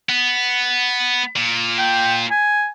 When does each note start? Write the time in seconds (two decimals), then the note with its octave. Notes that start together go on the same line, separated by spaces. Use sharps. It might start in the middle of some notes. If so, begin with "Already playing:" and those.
0.09 B3
1.36 A#2
1.79 G5
2.31 G#5